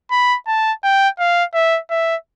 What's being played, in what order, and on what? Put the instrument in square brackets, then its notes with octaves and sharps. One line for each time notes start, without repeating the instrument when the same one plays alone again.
[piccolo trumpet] B5
A5
G5
F5
E5
E5